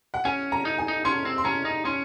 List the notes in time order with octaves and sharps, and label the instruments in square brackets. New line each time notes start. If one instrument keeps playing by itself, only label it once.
[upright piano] F#5
[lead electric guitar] C#4 [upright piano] G#5
[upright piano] A#5
[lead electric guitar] D#4
[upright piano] G#5
[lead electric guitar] D#4
[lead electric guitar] C#4 [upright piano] C6
[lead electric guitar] C4
[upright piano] C6
[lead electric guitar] C#4 [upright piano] A#5
[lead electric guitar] D#4
[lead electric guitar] C#4 [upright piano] C6